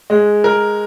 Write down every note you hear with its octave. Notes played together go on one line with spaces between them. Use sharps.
G#3 G#4
A#4